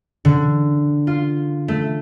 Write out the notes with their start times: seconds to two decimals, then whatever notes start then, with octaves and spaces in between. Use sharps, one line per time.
0.25 D3
1.07 F4
1.68 A3